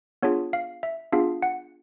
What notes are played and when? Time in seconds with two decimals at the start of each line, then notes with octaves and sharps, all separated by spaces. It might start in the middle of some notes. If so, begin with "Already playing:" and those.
0.23 B3 D4 F4 G#4 C#5
0.53 F5
0.83 E5
1.12 B3 D4 F4 G#4 F5
1.42 F#5